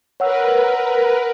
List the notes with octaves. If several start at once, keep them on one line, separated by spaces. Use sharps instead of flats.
A#4 B4 C#5 F#5 E6